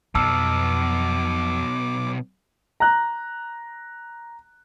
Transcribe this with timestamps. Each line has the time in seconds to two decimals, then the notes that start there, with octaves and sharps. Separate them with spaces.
0.15 B1 F2 B2 A5 D6 E6 F6
2.80 A#5 F#6